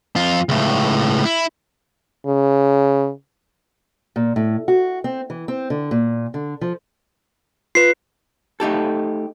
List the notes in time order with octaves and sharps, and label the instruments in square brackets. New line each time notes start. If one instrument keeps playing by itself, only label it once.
[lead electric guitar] F2 F4
C#2 A2
E4
[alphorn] C#3
[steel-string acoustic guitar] A#2
A2
F#4
C4
E3
C4
D3
A#2
D3
F3
[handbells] F4 B4 [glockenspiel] C7
[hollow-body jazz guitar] A3 D#4 G4 A4